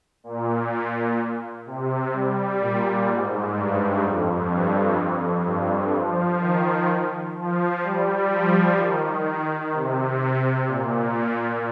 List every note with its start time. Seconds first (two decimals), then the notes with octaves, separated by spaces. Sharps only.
0.24 A#2
1.66 C3
2.13 G3
2.61 A#2
3.08 G#2
3.56 G2
4.03 F2
4.50 G2
4.98 F2
5.46 G2
5.93 F3
6.41 D#3
7.36 F3
7.83 G3
8.31 F3
8.78 D#3
9.73 C3
10.67 A#2